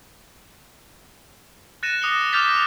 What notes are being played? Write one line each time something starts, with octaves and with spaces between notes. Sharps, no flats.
F#6 A6 A#6 C#7 D#7 E7
D6 D#6 C#7 G7
D6 F6 G6 A6 B6 F7